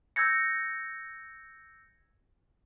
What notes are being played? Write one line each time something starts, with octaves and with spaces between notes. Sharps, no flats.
E6 G6 G#6 A#6 C#7